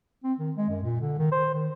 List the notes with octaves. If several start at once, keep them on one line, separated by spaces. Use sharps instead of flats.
C4
D#3
G#3
F#2
A#2
D3
D#3
C5
D#3